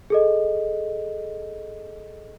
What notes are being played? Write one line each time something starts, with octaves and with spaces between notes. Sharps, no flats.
G#4 A4 D#5